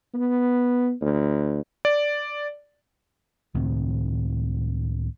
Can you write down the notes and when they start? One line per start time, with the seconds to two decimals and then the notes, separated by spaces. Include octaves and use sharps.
0.14 B3
1.01 D2
1.85 D5
3.54 C#2 A2 D#3 C4